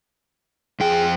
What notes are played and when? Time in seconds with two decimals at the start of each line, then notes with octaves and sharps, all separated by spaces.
0.80 F2 G#4 G5